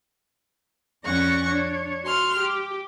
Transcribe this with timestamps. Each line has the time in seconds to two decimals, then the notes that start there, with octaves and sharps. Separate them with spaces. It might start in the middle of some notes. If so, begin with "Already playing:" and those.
1.05 F2 C#4 D5 F#5 C#6 A#6
1.48 D4 C#5
2.04 F#4 C6 F6
2.38 G4